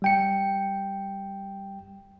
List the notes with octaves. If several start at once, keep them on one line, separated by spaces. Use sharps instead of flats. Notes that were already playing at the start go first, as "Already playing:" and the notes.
G3 G5 C#7